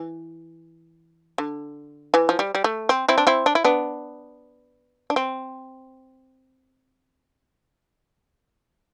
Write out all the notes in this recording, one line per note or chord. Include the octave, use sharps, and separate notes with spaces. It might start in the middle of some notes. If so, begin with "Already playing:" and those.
Already playing: E3
D3
E3
F3
G3
G3
A3
C4
C4 E4
D4
C4 E4
D4
E4
B3 D4
D4
C4